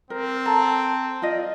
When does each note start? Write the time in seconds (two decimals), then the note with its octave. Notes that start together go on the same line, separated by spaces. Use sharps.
0.10 C4 A#4
0.45 A4 A5 A#5
1.22 F4 D5 D#5